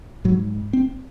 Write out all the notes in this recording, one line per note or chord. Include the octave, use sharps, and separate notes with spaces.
G#2 F#3
C4